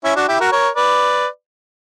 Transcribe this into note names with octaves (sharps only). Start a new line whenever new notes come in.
C#4 E4
D4 F#4
E4 G4
F#4 A#4
A#4 C#5
B4 D5